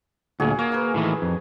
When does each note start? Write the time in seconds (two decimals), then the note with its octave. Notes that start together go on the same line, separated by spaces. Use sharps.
0.40 D2 A#2 F#4 G#4 G#5
0.59 A#3 C#5
0.72 A#4 B4
0.94 A2 D#3 E3
1.22 F2